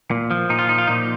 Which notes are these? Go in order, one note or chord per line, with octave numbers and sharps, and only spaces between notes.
A#2
F3
A#2 D#4
F4
F3 D#4
F4
A#2 D#4